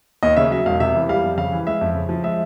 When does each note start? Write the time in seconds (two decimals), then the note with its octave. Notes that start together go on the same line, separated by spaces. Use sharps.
0.23 D#2 D#5
0.36 C#3 E5
0.51 F#3 E5
0.66 E1 F5
0.80 C3 E5
0.95 E3
1.09 G3 F5
1.24 F2
1.37 C#3 F5
1.52 E3
1.66 G#3 E5
1.81 F2
1.95 C#3
2.09 F3
2.24 G#3 E5